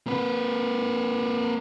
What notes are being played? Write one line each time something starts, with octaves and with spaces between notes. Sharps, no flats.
A#3 B4